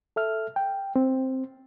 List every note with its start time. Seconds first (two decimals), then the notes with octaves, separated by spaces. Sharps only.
0.16 A4 E5 F6
0.56 G5
0.96 C4